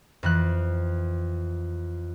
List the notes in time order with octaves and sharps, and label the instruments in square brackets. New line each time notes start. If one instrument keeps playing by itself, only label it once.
[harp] F2 E3 F#6